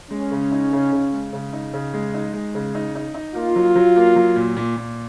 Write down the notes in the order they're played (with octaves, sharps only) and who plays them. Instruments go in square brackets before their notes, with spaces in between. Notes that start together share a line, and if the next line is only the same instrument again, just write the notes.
[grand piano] G#3 [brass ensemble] C#4
[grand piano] C#3
D#4
C#3
C#3
G#3
C#3
D#4
C#3
G#3
D#4
G#3
C#3
D#4
D#4
D#4
[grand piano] A#3 [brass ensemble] F4
[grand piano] F#3
F#3
A#3
F#3
A#2
A#2
A#2